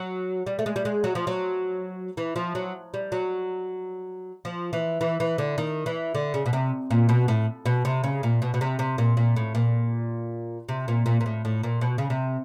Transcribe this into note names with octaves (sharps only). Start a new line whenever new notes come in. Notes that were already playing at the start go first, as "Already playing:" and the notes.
Already playing: F#3
G3
A3
G#3
G3
G#3
F#3
F3
F#3
E3
F3
F#3
G3
F#3
F3
E3
E3
E3
D3
D#3
E3
D3
C#3
B2
C3
A#2
B2
A2
B2
C3
C#3
A#2
B2
B2
C3
C3
A#2
A#2
A2
A#2
C3
A#2
A#2
A#2
A2
A2
A#2
B2
C#3
C3